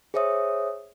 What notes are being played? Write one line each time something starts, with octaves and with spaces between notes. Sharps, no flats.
G#4 C5 C#5 E5 D#6